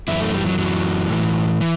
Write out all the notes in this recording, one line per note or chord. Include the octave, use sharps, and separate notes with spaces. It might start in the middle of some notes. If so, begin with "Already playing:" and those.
F#2 E3 E4
A3
G3
F#3
F#2 E3 F#3
A2 E3
E3